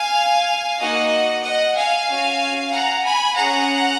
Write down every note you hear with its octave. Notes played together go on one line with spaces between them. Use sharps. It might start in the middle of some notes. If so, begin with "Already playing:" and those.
Already playing: F5 G#5
A#3 D#4 F#4 D#5 F#5
D#5 F#5
F5 G#5
C#4 F#4
F#5 A#5
G#5 B5
C#4 G#4 F#5 A#5